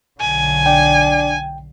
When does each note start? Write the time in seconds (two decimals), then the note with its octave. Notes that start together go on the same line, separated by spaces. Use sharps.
0.20 B1 D3 G#5
0.66 D4 G5